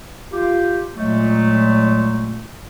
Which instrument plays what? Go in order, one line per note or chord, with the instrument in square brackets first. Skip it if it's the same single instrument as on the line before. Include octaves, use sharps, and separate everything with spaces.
[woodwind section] F4 G4
A#2 F#3 G#3 A3